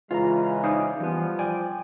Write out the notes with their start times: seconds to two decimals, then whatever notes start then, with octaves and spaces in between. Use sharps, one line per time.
0.11 C#3 E3 G#3 F4 F5 A#5
0.64 D#4 C5 D5 F5 G#5
1.00 E3 F3 G3 B3
1.39 D5 G5 G#5